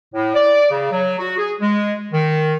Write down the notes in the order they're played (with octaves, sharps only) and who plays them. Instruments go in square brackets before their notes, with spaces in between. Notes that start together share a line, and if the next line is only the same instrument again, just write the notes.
[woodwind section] A2
D5
C#3
F#3
F#4
G#4
G#3
D#3